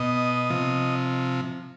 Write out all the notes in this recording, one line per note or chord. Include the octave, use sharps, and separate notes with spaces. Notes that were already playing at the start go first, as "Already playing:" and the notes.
Already playing: B2 D#5
C3 F3